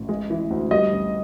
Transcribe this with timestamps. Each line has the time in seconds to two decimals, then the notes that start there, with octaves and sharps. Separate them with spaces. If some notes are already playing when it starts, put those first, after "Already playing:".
Already playing: A1
0.09 G#3
0.30 E3
0.50 D2
0.71 G3 D#5
0.92 A1